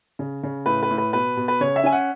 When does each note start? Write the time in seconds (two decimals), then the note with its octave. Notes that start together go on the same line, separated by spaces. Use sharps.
0.19 C#3
0.43 C#3
0.66 A2 B4
0.83 B4
0.90 A2
0.98 B4
1.13 B2 B4
1.37 B2
1.48 B4
1.61 C#3 C#5
1.76 E5
1.84 C#4 G#5
1.92 F#5